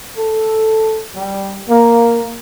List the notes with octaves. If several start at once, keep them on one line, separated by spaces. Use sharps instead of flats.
A4
G3
A#3